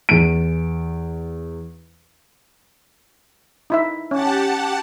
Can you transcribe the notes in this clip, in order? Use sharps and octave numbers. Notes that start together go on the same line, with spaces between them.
E2 D7
D#4 E4 E5
C#4 G4 F#5 A5